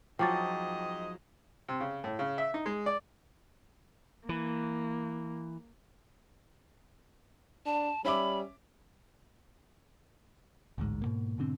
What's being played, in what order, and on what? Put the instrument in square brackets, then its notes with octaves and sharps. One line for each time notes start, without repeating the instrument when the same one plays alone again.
[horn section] G#2 C4 D#5 [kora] F3 F#3 [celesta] G5 D6 A6
[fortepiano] C3
C#3
A2
C#3
E5
D#4
G#3
D5
[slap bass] E3 [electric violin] A#3
[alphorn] D4 [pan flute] A5
[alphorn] G3 [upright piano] C#4 E5 D6 [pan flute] B5
[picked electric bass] A1 D2 G#2
G#2 B2 A#3
G#2 B2 D3 C4